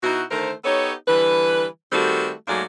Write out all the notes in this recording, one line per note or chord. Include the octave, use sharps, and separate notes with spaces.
B2 D#4 E4 F#4
D3 D#3 A3 A#4 C5
B3 D#4 G4 A4 C#5
D3 E3 G3 B4
D#3 G3 A3 C4 F#4 A4
G#2 F#3 A3 A#3 G#4 D5